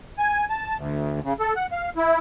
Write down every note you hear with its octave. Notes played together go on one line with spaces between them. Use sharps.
G#5
A5
D2
C#3
A4
F#5
F5
E4